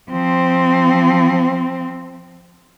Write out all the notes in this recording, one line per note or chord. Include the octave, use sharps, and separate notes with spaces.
F3 C4